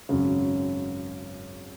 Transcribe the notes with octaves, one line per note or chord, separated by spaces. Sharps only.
G#1 F#2 C#3